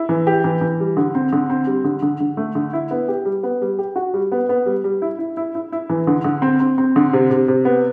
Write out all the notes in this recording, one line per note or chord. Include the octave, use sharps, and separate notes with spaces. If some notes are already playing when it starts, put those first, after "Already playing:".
Already playing: E4
E3
G4
E3
E3
G3
D3
C4
D3
C4
G3
D3
D3
D3
A3
D3
E4
B3
G4
G3
B3
G3
G4
F#4
G3
B3
B3
G3
G3
E4
E4
E4
E4
E4
E3
D3
D3
C4
C4
C4
D3
C3
C3
C3
B3